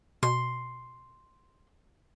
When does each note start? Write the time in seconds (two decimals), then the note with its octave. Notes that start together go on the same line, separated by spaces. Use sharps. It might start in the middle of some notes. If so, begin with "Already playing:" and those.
0.23 B2 C6